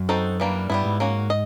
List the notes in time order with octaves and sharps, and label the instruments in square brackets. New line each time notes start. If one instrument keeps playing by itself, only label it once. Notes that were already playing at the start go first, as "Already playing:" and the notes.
Already playing: [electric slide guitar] F#2
[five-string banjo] C4 D#4 F#4 A4
E3 G3 A#3 D4
[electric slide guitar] G2 [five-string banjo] G3 B3 E4
[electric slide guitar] G#2
[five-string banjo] A#3 C#4 F#4
D#5